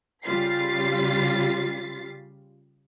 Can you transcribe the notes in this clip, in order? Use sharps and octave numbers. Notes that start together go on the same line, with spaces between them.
C#3 G3 F4 A6 B6 C7